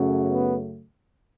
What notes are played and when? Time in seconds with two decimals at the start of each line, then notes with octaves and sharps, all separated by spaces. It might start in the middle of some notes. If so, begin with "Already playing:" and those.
Already playing: F#2 C#3 F#3 A3
0.28 B3